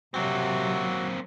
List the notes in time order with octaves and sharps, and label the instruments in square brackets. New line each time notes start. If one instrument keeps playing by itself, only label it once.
[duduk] C3 [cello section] F#3 [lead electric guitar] A#3 C4 [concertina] F#4